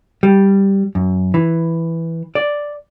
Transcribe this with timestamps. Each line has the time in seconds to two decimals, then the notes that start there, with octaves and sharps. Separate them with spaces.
0.23 G3
0.95 F#2
1.34 E3
2.35 D5